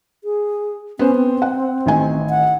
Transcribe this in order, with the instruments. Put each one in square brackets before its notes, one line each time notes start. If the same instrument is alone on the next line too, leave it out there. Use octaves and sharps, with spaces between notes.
[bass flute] G#4
[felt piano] B3 C5 [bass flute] C#4
[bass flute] C4
[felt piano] F#5
A1 D#3 G#5
[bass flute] F#5